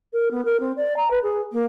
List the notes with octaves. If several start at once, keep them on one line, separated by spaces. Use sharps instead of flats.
A#4
B3
A#4
C4
D5
A#5
B4
G#4
A#3